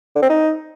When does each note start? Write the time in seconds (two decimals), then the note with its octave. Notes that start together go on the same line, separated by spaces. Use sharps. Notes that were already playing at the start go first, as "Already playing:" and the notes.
0.15 D3
0.22 C4
0.30 D#4